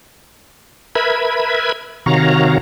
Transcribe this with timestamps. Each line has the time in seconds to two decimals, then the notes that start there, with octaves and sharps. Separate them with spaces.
0.95 A#4 B4 E5 B5 G#6
2.06 C3 D#3 F#4 C#5 F5 A#5